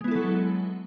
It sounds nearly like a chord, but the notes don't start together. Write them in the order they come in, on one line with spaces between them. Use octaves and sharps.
G#3 B3 E4 A4 F#3